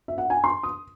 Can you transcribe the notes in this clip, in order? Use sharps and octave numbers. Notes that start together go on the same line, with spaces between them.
E5
F#5
G#5
C6
D#6